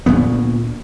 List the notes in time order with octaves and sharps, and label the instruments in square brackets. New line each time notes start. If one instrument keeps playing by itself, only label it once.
[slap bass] D2 A#2 G#3 B3